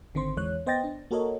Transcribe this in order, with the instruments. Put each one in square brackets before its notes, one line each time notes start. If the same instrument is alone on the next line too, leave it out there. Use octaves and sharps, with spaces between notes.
[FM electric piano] G#1 D3 D#3 C4 C5 C6
E2 E3 G#3 C#5 F#6
B3 C5 D#5 G5 A6 A#6
D4
A#3 F#4 A4 A#4 C#5 D#5